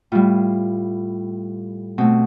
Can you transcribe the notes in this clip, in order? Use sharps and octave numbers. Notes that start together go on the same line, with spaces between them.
A2 G3 F4
B2 A3 C4